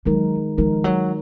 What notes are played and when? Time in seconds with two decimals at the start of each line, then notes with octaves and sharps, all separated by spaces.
0.06 D#3 F#3 G#3 D#4 A#4
0.58 D#3 F3 G#3 D#4 A#4
0.84 F#3